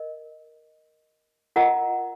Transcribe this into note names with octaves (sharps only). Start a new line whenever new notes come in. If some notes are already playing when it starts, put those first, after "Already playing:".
Already playing: A#4 D#5
F4 A#4 D#5 F#5 A#5